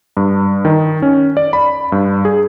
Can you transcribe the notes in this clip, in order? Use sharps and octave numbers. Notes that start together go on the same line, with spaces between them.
G2
D#3
C#4
D5
B5
G2
G#4